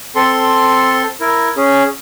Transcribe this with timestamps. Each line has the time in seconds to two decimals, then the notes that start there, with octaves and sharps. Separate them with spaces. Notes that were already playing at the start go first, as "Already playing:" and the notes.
0.16 C4 A4 C6
1.21 E4 A#4
1.57 C#4 G#4